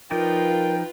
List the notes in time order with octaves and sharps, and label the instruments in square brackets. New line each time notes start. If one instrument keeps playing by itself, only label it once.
[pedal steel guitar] F3 D#4 D5 [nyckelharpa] F4 B4 [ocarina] A#4 [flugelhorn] G5